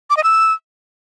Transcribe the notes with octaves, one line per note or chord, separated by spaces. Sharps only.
D6
D#5
E6